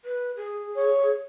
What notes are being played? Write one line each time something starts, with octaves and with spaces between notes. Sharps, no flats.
B4
G#4
C#5